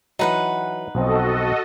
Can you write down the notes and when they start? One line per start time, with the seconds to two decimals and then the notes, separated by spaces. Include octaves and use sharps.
0.19 E3 F#3 D#4 B4 F#5
0.95 B1 F3 C4 F#4 A4 D#5